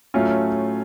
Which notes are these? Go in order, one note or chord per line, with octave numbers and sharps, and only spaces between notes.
A2 F#3 A3 C#4 F4